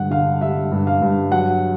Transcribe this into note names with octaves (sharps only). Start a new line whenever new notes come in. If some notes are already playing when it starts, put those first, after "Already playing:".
Already playing: G2 D3 F#5
D3 F5
G3 E5
G2
F5
G2
F#3 F#5